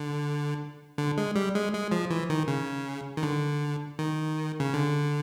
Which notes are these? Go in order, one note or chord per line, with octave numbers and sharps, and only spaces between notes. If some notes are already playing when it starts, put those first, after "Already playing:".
Already playing: D3
D3
G#3
G3
G#3
G#3
F3
E3
D#3
C#3
D#3
D3
D#3
C#3
D3